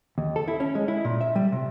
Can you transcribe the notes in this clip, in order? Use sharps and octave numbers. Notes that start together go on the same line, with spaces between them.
D#2
A4
E4
C#4
G#3
E4
A#2
E5
G3
C3